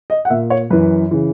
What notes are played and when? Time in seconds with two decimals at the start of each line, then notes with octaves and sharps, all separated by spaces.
0.10 D#5
0.25 F#5
0.30 A#2 E5
0.50 C#5
0.70 F#2 E3 B4
1.11 C#3 E3